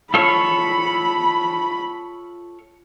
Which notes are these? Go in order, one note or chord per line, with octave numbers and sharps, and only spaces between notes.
F4 A4 C#5 B5